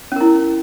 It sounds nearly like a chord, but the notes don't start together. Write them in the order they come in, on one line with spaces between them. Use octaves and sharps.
C#4 A#4 E4